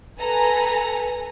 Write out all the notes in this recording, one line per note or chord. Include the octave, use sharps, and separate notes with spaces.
A4 B4 G#5 A#5